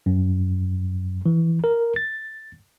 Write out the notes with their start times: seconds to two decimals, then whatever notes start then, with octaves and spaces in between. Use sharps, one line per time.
0.06 F#2
1.26 E3
1.64 A#4
1.96 A6